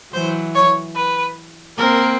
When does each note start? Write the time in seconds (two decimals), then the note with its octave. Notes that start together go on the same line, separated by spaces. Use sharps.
0.13 E3 F#3 C5
0.55 C#5
0.96 B4
1.78 A#3 C4 A#4